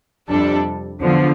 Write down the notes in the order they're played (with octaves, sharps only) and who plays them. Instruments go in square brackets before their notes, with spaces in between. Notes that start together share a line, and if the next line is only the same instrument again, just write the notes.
[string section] F2 C3 G3 D4 A4
E2 D3 F3